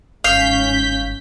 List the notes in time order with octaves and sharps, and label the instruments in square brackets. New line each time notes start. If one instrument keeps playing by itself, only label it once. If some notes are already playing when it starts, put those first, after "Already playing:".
[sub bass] G1 [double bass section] G#2 C#4 [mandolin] F5 [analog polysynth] G6 B6